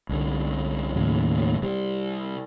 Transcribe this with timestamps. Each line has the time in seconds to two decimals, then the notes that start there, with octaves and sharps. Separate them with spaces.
0.09 C2 D3
0.95 D#2 A2 C#3 F#3
1.62 C3 G3 C4